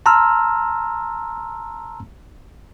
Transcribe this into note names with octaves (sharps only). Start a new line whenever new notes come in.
A5 A#5 C6 E6 F6